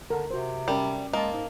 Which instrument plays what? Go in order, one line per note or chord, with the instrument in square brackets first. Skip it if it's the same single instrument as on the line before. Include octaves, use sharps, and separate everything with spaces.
[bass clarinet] D3 [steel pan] A#4
[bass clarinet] C3 [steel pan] F#4 C5
[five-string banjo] G3 [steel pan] C#4 A#4 A5
[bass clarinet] G#3 [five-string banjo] A#3 [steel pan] D#5 A5
[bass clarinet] G#2